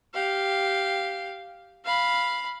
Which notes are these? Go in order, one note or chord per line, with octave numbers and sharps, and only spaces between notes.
G4 F5
F5 B5